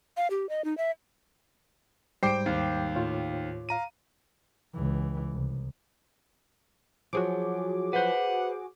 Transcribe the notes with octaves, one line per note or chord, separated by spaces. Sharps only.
F5
G4
D#5
D#4
E5
G#2 G3 C5 G5 D6 C7 D7
D#2
A2 F4 C#5
F5 A#5 D#7
C#2 E3
C2
F3 F#3 F#4 G#4 D6
B4 C5 F#5